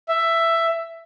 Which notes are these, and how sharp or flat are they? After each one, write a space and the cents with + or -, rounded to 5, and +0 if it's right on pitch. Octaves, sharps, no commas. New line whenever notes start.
E5 +10